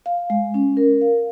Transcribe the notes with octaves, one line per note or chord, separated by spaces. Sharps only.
F5
G#3
C#4
A#4
F5